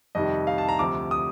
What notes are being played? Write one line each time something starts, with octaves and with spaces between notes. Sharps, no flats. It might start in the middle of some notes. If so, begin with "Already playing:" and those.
F2 C3 D#3 G3 D#5
F5
A5
A#5
D2 C3 F3 D6
D#6